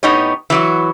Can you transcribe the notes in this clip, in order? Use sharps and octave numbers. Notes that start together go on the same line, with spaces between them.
A2 B3 D#4 G4 C#5
E3 F#3 F#4